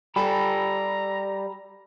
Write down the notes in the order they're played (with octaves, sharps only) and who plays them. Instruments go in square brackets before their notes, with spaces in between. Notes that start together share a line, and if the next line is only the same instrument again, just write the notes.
[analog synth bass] G3 [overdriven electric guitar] G4 A4 [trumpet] A#5 [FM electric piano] B5